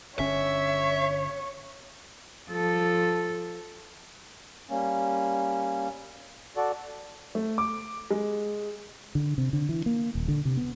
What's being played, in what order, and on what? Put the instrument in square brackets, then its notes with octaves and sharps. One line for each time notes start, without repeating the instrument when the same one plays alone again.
[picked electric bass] G1 D3 C#4 [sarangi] C#5 [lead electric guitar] E5
[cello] F3 A4
[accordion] G3 A#3 C#4
F#4 A4 D5
[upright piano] A3
D6
G#3
[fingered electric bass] D3
C3
D3
E3
A#3
D#1
D3
C3
B3